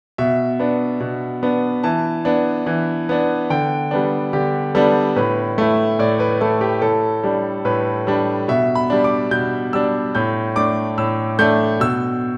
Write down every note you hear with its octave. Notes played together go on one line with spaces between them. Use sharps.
B2 E5
B3 D4
B2
B3 D4
E3 A5
B3 D4
E3
B3 D4
D3 G5
G3 B3 D4
D3 G4
G3 B3 D4 A4
A2 B4
A3 E4
A2 D5
B4
A3 E4 A4
G4
A2 A4
G3 D4
A2 B4
G3 D4
B2 E5
B5
G3 D4
D6
B2 G6
G3 D4 E6
A2 G6
A3 D4 D6
A2 E6
A3 D4 G6
B2 E6